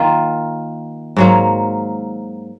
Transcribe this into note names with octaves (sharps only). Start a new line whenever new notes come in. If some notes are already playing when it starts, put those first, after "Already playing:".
Already playing: D#3 A#3 F4
G#2 F#3 A#3